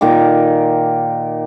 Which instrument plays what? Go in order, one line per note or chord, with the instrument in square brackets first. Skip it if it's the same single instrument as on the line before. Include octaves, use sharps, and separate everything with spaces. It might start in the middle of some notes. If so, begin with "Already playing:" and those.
[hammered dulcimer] A#2 D#3 A#3 D6